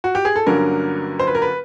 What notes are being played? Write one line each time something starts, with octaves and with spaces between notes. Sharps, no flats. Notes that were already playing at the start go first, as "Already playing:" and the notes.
F#4
G4
G#4
A4
G2 D3 F#3 A#3 C#4 A#4
C5
B4
A#4
B4